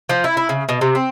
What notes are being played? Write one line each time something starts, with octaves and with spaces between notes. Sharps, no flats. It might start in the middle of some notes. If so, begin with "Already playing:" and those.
F3
E4
E4
C#3
B2
C3
C4